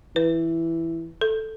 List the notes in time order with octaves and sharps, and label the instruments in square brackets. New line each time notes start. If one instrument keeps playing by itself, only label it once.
[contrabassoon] E3 [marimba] B4
[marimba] A4